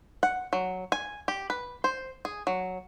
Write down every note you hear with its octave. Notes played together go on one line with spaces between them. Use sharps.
F#5
F#3
G#5
G4
B4
C5
G#4
F#3